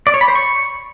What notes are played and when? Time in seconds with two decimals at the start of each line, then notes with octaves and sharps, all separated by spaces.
0.07 D5
0.14 C#5
0.21 B5
0.28 C5
0.35 C#6